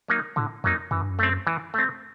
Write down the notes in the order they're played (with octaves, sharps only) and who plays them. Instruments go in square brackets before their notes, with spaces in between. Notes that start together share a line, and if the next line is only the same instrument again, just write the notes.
[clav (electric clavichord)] F#3 A#3 D#4
[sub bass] A2 [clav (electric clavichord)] D3
[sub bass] F2 [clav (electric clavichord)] F#3 A#3 D#4
[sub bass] F#2 [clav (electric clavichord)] E3
[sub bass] G2
F#2
[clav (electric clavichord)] A3 C4
E3
A3 C4